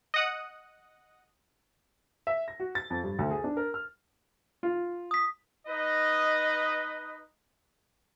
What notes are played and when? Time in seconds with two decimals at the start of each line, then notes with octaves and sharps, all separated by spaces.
0.14 D#5 F#5 D#6
2.27 E5
2.48 A#6
2.60 F#4
2.75 A6
2.90 F2
3.04 G2
3.19 D2
3.31 G#4
3.44 D4
3.57 A#4
3.74 F6
4.63 F4
5.11 D#6 B6
5.67 D#4 B4 D#5